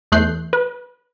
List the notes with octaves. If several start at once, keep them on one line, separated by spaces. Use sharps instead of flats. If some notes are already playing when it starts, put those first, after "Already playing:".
E2 A3 F#6 G6 C7
B4